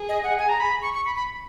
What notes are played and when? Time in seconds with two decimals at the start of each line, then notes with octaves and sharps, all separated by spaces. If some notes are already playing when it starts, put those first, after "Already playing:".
Already playing: G#4
0.09 D#5
0.24 F#5
0.38 G#5
0.49 A#5
0.60 B5
0.82 C#6
0.94 C#6
1.05 B5
1.15 B5